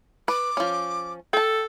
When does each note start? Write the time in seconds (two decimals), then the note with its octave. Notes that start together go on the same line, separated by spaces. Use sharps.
0.28 B4 D6
0.57 F3 C#4
1.33 A4 G5 A5